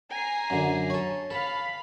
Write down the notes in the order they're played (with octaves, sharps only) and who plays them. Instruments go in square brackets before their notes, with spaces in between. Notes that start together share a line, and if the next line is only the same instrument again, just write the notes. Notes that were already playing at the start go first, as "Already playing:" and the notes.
[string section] G#5 A#5 C7
[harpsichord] F#2 D3
A4 C#5
[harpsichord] A4 [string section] F5 B5